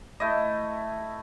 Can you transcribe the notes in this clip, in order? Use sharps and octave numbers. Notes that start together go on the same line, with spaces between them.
A3 E4 D#5